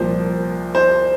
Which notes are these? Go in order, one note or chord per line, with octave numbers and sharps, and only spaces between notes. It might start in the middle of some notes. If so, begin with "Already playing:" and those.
Already playing: C2 A#2 F3 C5
C5